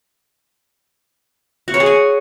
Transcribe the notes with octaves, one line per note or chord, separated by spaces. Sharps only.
F#4
C#5
G#4
G#5